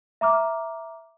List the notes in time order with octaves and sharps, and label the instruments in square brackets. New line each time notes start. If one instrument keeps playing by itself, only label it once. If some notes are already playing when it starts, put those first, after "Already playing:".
[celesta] E5 A#5 D6 F6